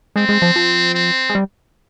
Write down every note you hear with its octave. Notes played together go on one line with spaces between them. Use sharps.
G#3 C4
G#3
F3
F3
C4
G#3
G3